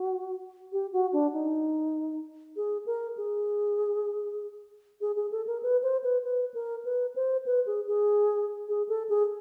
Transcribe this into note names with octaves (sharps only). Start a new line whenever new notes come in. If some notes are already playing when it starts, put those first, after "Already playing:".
Already playing: F#4
G4
F#4
D4
D#4
G#4
A#4
G#4
G#4
G#4
A4
A#4
B4
C5
B4
B4
A#4
B4
C5
B4
G#4
G#4
G#4
A4
G#4